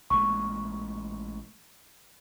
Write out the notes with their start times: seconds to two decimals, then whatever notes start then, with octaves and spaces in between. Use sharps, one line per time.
0.10 A1 A#2 G#3 C#6